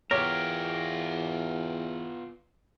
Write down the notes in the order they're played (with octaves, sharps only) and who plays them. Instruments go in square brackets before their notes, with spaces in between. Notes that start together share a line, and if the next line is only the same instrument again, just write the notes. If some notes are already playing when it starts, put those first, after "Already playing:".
[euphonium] E2 [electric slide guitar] B3 F4 [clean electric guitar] G4 A#4 [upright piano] C#5